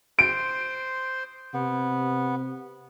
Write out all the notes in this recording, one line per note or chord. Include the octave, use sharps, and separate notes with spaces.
C5 C6 D7
C3 B3